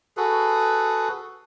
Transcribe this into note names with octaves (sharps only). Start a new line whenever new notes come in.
F#4 G#4 A4 B4